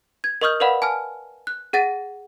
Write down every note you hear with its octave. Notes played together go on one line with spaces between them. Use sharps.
G#6
A#4 D#5 C#6 D#6 F6 G6
A#4 B4 D5 F5 F#5 B5
G#5 A5 F6
F#6
G#4 F#5 A6 A#6 D#7